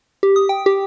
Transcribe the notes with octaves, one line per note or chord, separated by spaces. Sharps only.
G4
D#6
G5
G4